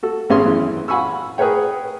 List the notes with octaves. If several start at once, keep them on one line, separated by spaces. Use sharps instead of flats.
F#4 A4
G#1 B3 C#4 G#4 C6
F#2 E3
F5 F#5 G#5 B5 C#6 E6
G#4 A#4 B4 C#5 G5